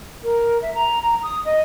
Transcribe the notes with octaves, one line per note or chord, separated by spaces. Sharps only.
A#4
E5
A#5
A#5
D#6
D#5